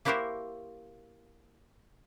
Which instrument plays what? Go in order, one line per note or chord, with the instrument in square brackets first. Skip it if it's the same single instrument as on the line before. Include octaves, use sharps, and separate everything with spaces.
[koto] A#3 E4 F#4 G4 A#4 C5